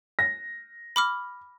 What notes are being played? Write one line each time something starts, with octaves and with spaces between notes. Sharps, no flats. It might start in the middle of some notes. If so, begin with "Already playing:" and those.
A#6
B5 D6 F6